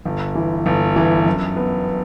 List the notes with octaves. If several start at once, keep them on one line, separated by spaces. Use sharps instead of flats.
G1
E3
G1
E3
F#2
B3